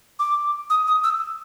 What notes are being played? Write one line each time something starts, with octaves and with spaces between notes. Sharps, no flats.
D6
D#6
D#6
E6